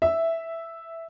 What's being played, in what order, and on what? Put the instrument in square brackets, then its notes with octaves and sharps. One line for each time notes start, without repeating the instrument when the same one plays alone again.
[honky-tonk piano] E5